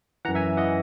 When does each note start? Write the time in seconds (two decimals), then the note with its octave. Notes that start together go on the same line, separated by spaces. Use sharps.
0.25 E3 F#5 A#5
0.28 F#2
0.35 E5 G#5
0.57 E3 D#5 F#5